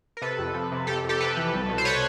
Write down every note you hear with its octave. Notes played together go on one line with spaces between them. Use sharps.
A#4
C3 A4 B4
F2
F3
C3
F2 G4 A4
F2
G4 A4
C3 A4 B4
E3
C2
B2
C5
B4 C#5